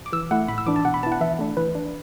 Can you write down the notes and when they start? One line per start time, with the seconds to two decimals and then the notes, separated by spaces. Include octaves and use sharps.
0.06 D6
0.13 E3 E6
0.31 A3 E4 F#5
0.48 A2 B5
0.58 E6
0.66 E3 D4 D6
0.76 A5
0.85 B2 F#5
0.94 B5
1.03 B3 E4 A5
1.12 F#5
1.21 E3 E5
1.39 A3 D4
1.57 E3 B4
1.75 D4